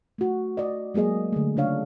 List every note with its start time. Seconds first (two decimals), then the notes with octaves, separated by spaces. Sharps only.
0.18 A3 F#4
0.57 D5 D#5
0.94 F#3 G#3 A#3 G#4 D#5
1.33 D3 G#3 A3
1.57 C#3 D4 C#5 F5